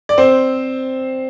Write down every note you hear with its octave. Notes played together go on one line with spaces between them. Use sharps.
D5
C4 C5